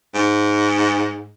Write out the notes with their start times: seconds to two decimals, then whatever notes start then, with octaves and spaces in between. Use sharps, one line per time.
0.15 G#2